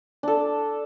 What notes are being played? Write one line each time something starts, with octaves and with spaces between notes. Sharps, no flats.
D4 A4